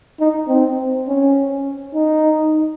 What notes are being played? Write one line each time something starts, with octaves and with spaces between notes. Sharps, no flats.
D#4
C4
C#4
D#4